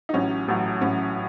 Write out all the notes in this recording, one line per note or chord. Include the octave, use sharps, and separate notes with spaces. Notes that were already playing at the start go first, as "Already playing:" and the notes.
D#4
A1 A2 F#3 C#4
A1 A2 F#3
A1 A2 F#3 C#4